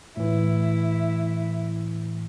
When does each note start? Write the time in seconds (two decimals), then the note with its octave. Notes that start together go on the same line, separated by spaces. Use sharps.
0.17 A2 E3 E4